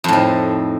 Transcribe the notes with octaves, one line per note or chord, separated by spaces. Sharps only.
F2 A2 D#3